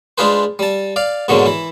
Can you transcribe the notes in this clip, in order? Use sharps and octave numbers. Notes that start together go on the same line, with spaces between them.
G#3 D4 F4 G#4 B4 C5
G3 A5
D5 F5
G#2 B2 D3 F#3 G#3 A#3
E3 E4